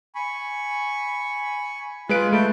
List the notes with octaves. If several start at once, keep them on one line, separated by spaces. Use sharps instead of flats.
G#5 B5 C#6
G#3 F4 B4 F#6 D7
A3 A5 B5 G6